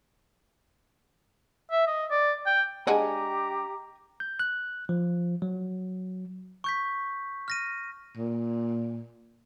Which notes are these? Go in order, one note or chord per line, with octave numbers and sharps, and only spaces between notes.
E5
D#5
D5
G5
G#3 D4 G4 D#5 F#5 G#5 A#5
G6
F#6
F3
F#3
C#6 G6 B6
F6 A#6 D#7
A#2